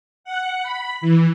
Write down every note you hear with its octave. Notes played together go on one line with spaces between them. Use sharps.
F#5
B5
E3